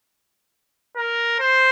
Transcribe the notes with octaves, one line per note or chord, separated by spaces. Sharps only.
A#4
C5